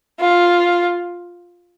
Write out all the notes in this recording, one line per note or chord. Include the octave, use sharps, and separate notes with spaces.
F4